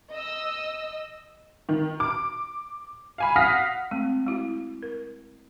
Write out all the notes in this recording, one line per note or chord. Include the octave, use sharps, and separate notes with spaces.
D#5 E6
D#3
D6
F5 G#5 B5
F5 F#5 D#6 F6 A#6 B6
G#3 A3 C4
G#3 E4 F#4
A#4